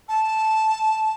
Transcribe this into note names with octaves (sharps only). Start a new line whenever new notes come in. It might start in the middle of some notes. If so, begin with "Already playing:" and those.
A5